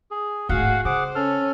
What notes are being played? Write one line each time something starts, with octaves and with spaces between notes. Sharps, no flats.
G#4
D1 G#1 F#4 G#4 F5 F#5
C#3 G#4 C5 F#5 D6
C#4 A4 F6